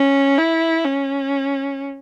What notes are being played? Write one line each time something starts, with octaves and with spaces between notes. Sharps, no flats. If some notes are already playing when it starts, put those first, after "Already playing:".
Already playing: C#4
E4
C#4